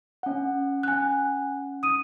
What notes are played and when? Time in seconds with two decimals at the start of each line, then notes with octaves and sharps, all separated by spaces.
0.23 C#4 F#5
0.83 G#5 F#6
1.83 D#6 D#7